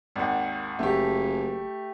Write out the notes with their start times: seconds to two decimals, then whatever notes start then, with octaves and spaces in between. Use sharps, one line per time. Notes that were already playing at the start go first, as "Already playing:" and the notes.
0.16 G#1 D#2 F#5
0.79 F#1 A3 G4